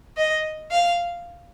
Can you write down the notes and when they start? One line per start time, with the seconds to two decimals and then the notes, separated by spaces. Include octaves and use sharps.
0.17 D#5
0.71 F5